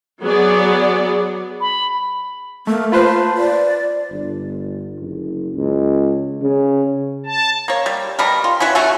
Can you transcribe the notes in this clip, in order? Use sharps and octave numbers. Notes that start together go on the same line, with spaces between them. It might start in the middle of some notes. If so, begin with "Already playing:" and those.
F#3 B3 G#4 D5
B5
A3 A#3
F4 B4 C5 A5
D5
G1
F#1
C#2
C#3
A5
A#3 C#5
G3
B2 G3 A#4
F4
C#4 E4 F#4 B4
A3 C#4 F#4 A4